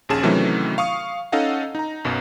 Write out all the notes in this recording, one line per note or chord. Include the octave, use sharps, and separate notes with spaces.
A#1 D#2 C#4 G#4 A5 E7
C3 D#3 E3 F#3 A3 C#4
F5 C#6 D#6
C#4 D#4 A4 D#5 F5 F#5
D#4 A#5
B1 F#2 B2